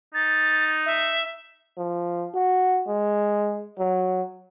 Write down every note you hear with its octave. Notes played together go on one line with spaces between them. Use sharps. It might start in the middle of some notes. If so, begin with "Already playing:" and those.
D#4 A6
E5
F3
F#4
G#3
F#3